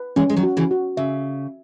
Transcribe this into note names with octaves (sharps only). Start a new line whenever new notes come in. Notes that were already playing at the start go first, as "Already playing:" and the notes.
Already playing: B4
E3 G#3 C#4
G#3
D#3 F#3
F#4
C#3 E3
F#4
C#3 E5